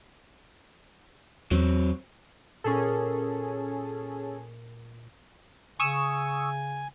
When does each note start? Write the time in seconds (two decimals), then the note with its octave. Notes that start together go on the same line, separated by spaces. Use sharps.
1.51 E2 F#3 C4
2.64 A#2 C#4 G#4 A4
5.80 C#3 G#5 C#6 D#6 E6